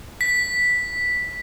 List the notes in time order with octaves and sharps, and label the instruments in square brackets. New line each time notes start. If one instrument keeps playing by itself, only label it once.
[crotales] B6